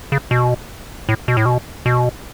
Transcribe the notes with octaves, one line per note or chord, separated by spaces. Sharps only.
C#3
B2
A2
B2
A2
B2
B2